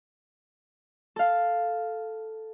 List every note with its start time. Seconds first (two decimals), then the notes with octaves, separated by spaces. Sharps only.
1.16 A4 F5